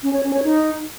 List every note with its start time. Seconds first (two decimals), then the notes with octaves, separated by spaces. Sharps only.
0.03 C#4
0.13 C#5
0.23 C#4
0.33 C#5
0.43 D#4